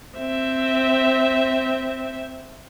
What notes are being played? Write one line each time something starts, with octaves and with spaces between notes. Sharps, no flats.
C4 E5